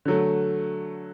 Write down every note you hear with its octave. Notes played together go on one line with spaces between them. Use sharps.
D3 F#3 A3